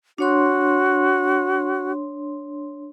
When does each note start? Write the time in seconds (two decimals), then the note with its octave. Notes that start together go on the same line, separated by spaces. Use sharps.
0.18 D4 F#4 C#5 C6